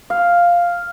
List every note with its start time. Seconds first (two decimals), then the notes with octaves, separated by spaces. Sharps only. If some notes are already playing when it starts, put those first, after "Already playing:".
0.10 F5